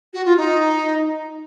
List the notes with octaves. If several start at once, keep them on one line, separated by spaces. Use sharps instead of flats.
F#4
F4
D#4